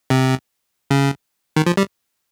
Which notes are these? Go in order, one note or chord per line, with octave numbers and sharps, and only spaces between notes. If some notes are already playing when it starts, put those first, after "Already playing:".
C3
C#3
D#3
F3
G3